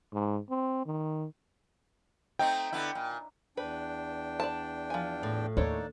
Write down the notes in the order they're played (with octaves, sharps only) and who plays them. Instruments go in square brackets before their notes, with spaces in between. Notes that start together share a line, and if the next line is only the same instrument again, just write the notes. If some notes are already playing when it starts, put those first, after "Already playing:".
[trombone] G#2
C4
D#3
[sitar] A3 C4 D#4 [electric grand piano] G5
[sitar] D3 B3 E4
A#2
[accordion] E2 D4 G5 [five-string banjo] B4
[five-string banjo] D5 A5
F3 G#5
[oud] A2
[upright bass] D#2 [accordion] A#3 D#4 [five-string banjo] D4 A4 C#5